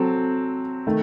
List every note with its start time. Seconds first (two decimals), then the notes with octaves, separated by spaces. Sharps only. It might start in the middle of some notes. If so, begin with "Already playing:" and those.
Already playing: F#3 C4 A4
0.87 D#3 A3